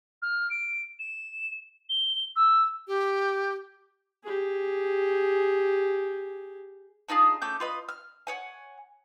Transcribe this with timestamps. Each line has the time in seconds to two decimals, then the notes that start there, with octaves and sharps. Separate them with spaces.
0.22 F6
0.50 D7
0.99 E7
1.89 G7
2.36 E6
2.87 G4
4.24 G4 G#4
7.09 D4 D#4 F4 G#4
7.42 A3 C#4 D6 G6
7.60 F4 B4 D#5
7.89 F6
8.27 C#5 F#5 G#5